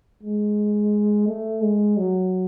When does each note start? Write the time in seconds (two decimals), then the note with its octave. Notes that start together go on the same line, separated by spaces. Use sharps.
0.23 G#3
1.27 A3
1.62 G#3
1.97 F#3